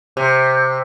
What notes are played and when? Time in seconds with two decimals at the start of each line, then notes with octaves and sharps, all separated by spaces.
0.17 C3